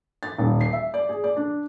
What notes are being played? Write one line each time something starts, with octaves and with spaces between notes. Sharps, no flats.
A6
D#1
C7
E5
D5
G#4
D5
D4